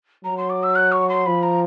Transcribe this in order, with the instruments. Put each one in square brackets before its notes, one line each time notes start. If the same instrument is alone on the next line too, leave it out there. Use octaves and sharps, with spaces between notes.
[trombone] F#3 [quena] A#5
[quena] C6
D6
E6
F#6
C#6
C6
[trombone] F3 [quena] B5
[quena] A#5